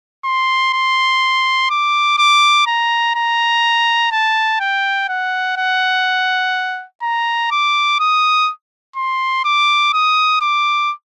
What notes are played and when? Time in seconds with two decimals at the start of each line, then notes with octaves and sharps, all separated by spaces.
0.25 C6
0.73 C6
1.70 D6
2.18 D6
2.67 A#5
3.16 A#5
4.12 A5
4.60 G5
5.09 F#5
5.57 F#5
7.03 A#5
7.51 D6
8.00 D#6
8.96 C6
9.45 D6
9.93 D#6
10.42 D6